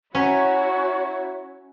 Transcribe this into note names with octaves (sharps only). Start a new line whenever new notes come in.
C#4 E4 F#4 C#5 F#5 A#5 B6